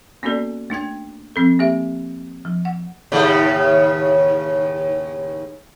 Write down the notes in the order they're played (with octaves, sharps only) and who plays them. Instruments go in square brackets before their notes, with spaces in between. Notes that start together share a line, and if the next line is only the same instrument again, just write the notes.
[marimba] A#3 B3 C#4 F#4 A4 D5
A3 D4 G5 G#6
F3 C4 A4
A#3 G4 E5
F3
F#5
[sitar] D#2 A2 C#3